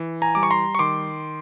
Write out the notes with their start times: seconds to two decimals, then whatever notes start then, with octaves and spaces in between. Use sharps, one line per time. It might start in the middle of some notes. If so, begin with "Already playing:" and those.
Already playing: E3
0.22 G#5 A#5
0.35 G3 D6
0.43 C#6
0.51 A#5 C6
0.75 C#6
0.79 D#3 C6 D6